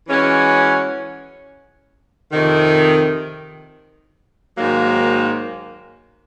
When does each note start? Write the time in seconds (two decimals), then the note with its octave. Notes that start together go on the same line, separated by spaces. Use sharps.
0.06 E3 G#3 C#4 F#4
2.32 F2 C3 D#3
4.58 G#2 D#3 F#3 A#3